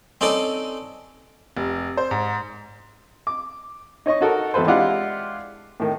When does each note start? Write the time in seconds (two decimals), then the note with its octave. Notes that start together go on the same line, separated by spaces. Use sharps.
0.21 C4 C#4 D#4 A4 D5
1.57 F1
1.97 C5
2.11 G#2
3.27 D6
4.06 D#4 C#5 D#5 C#6
4.21 D#4 F#4 A4 A#4
4.54 G#1 E2 A4 B4 C5
4.67 G#3 D4 E4 F4 G4 F#5
5.80 A2 D#3